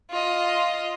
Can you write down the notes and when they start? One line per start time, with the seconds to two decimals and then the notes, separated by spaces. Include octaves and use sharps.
0.10 F4 D#5